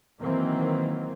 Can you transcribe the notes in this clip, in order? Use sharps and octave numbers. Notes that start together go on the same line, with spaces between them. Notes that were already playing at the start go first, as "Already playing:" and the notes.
D#3 E3 F#3 A#3 C4